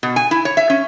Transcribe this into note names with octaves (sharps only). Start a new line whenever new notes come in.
B2
G#5
E4
C#5
E5
C#4